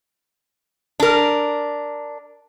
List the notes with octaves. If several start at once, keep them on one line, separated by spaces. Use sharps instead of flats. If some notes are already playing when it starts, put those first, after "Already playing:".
D4 A#4